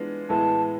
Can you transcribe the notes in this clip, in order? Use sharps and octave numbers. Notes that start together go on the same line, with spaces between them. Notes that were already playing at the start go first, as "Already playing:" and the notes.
Already playing: E3 G#3 B3 D4 F4
A2 E3 G#3 B3 E4 A5